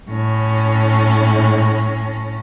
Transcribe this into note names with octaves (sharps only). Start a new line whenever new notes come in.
A2 C#4